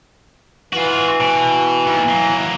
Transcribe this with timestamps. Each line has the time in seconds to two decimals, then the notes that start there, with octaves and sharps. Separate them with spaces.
0.73 E3 F4 F#4
1.20 B2
1.87 D#2
2.08 F#3 A#3